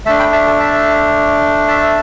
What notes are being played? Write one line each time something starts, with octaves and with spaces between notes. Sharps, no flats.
A3 D4 E5 A5
G5 B5
E5 A5
A4
E5 A5
E5 A5